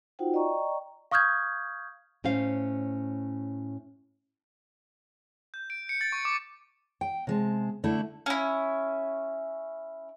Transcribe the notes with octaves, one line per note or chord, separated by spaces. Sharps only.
D#4 F4 F#4 C5 F#5 G5
D5 D#5 G5 A#5 C#6
F5 C#6 D#6 F6 G6 G#6
A2 C#4 C5 F5
G6
D7
C#7
A6
C#6
D6
G5
C3 G#3 A5
D3 A3 E4
C#4 E4